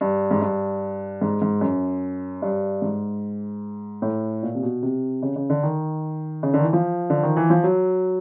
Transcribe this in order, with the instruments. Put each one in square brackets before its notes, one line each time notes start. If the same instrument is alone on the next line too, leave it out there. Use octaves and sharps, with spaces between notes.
[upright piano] G2
G#2
G2
G#2
G#2
F#2
G2
G#2
A2
A#2
C3
B2
C3
C#3
C#3
D3
D#3
C#3
D3 D#3
E3
F3
D3
D#3
E3
F3
F#3